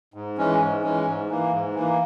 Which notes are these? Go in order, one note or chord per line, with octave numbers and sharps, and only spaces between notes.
G#2
E3 G#3 C#4
G#2
E3 G#3 C#4
G#2
E3 A#3
G#2
E3 A#3